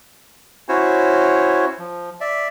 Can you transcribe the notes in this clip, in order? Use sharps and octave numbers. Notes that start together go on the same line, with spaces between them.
C#4 E4 F#4 C5 C#5
F3
D5 E5